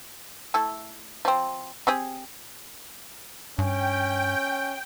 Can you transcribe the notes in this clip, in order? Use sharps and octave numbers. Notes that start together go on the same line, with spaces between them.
A3 E4 A4
F3 C4
C4 G4 G#4
G2 C#4 G5